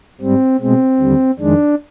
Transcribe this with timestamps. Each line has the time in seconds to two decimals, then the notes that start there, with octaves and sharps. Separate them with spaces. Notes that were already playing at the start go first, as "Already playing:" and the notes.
0.21 G#2 G3 C4
0.60 B2 G#3 C4
0.99 D#2 D3 G3
1.40 F2 D#3 G#3 D4